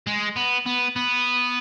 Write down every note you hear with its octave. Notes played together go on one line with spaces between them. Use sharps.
G#3
B3
B3
B3